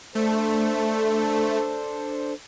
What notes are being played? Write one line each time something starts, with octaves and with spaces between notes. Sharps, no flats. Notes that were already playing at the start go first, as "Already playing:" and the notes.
A3 D4 A4 C5